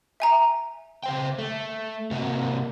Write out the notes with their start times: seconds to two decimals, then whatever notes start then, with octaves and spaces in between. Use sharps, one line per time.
0.20 E5 G#5 A#5
1.03 C#3 C5 G5
1.39 A3
2.11 C3 A#3 F#4